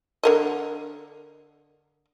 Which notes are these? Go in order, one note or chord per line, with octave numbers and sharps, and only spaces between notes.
D3 A#4 D#5